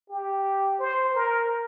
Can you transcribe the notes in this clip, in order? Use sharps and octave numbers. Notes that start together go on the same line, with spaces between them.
G4
C5
A#4